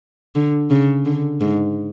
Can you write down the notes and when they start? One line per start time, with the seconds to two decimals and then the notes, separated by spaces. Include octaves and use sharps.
0.35 D3
0.70 C#3
1.05 D3
1.40 G#2